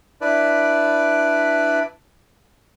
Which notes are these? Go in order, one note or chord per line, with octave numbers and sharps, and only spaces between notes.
D4 E4 B4 D5